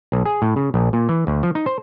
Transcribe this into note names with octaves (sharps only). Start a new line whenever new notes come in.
B1
G#4
A2
C#3
A#1
A#2
E3
D2
F3
D#4
C5